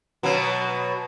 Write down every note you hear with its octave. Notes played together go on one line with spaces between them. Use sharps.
B2 F#3